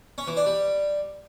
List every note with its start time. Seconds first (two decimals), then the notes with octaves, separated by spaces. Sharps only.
0.18 C#4
0.27 E3
0.37 D4
0.46 G3